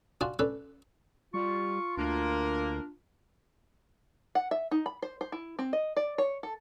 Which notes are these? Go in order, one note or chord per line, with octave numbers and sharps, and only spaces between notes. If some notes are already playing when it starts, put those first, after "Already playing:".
D4 F4 F#4 D5 G#5
C#4 D4 A4 B4
G3 F4 C#6
D2 A#3 D4 A#4
F#5
E5
D#4
B5
C5
C5
E4
C4
D#5
D5
C#5
A4